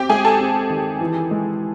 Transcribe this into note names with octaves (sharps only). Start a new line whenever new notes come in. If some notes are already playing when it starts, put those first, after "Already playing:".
Already playing: C4 G4 G5
G#3 G#4 G#5
A4 A5
C4
D#3
E3
G#3